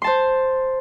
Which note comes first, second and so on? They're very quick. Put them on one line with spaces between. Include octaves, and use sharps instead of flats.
C6 A5 C5